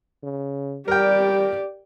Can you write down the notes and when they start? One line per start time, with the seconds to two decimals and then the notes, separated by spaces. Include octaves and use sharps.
0.23 C#3
0.88 G3 G4 A#4 D5 G5